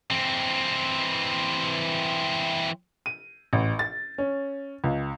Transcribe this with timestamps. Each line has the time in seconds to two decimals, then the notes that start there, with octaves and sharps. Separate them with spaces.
0.10 E3 C4
3.06 D#7
3.53 A1
3.79 A6
4.18 C#4
4.84 C#2